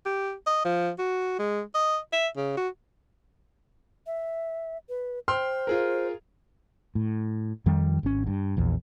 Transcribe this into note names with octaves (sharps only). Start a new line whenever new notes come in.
G4
D#5
F3
F#4
G#3
D#5
E5
C#3
F#4
E5
B4
C5 G5 C6 F6
F4 G#4 A#4
A2
F2 D#3 G3
G#1 C#4
G2
A#1 E2